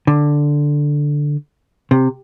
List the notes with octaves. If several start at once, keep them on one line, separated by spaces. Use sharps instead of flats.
D3
C3